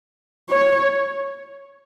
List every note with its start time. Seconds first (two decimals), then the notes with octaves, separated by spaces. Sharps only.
0.49 C#5